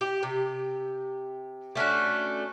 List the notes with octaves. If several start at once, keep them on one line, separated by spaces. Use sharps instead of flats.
G4
C3
A3 C#4 D4 F#4